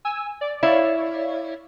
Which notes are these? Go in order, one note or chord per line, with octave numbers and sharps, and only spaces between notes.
G#5 E6
D5
E4 C#5 D5 F5